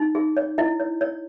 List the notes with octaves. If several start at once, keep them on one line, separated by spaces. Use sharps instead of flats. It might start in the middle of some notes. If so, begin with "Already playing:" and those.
Already playing: D#4
G#4
C#5
E4 D#5
C#5
C#5